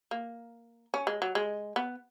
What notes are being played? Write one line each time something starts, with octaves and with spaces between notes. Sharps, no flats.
A#3
C#4
G#3
F#3
G#3
B3